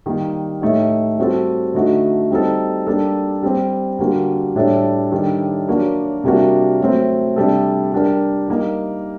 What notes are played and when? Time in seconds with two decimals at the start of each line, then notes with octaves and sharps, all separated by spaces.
0.06 D#3 G3 A#3
0.61 A2 A3 D#4 G4
1.18 G3 C4 F#4 A4
1.74 D3 A3 D#4 F#4
2.31 G3 C4 D#4 A4
2.87 G3 A#3 D4 A4
3.43 G3 C4 G4
3.99 D3 G3 A#3 F#4
4.55 A2 G3 D4 A4
5.11 D#3 G3 D4 A4
5.68 F#3 A#3 D4 F#4
6.24 C3 G3 A#3 D4 F#4
6.80 F#3 A3 C4
7.36 C3 G3 D4 A4
7.92 G3 D4 G4 A#4
8.48 G3 A#3 D#4 G4